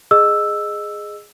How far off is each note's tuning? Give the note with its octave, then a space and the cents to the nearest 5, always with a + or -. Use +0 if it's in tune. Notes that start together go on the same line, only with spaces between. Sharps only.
G#4 +0 D#5 -15 E6 +0